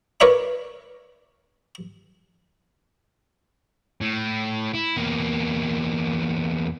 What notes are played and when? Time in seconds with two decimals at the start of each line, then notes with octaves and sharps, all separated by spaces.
0.20 A#4 B4 C#5 D5 E5 B5
4.01 A2
4.74 E4
4.96 E2 A#3